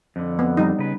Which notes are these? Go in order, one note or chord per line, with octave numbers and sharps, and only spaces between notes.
F2 D3
B3
G3 D#4
C#3 B4